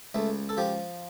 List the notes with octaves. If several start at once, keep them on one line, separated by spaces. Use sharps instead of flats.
C#2 A3
A4
F3 G4